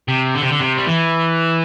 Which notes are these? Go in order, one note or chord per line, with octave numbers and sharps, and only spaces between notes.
C3
D3
C3
D3
C3
G3
E3